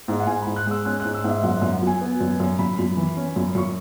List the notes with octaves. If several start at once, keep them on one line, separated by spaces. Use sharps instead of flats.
G#2
F#5
G#2 G#5
G#2 B5
F#6
G#3 E6
C#4 F#6
G#2 F#6
E6
G#2 E5
F#2 F#5
F#2 E5
F#5
F#3 G#5
B3
F#2
F#2
F#2 B5
F#2
E3
C#4
F#2
F#2 C#6